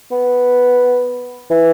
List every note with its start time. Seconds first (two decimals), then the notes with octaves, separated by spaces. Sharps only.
0.11 B3
1.51 E3